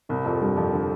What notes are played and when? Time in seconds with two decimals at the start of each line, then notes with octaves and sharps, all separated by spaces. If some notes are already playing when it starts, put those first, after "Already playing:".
0.09 C2 C3
0.25 F2 F3
0.41 G2 G3
0.57 F2 F3
0.73 D3